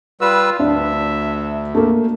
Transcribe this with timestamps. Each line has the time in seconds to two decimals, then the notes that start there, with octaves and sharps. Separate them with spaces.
0.21 G3 F4 B4 E6
0.59 D2 D4 E5
1.75 A3 A#3